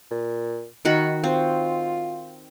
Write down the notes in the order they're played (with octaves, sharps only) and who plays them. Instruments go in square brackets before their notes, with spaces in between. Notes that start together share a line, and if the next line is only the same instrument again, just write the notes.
[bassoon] A#2
[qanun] D#3 F#4 B5 [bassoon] D#4
[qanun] C4 [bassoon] F4